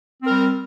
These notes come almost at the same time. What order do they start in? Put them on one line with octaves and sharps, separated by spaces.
C4 A#4 G3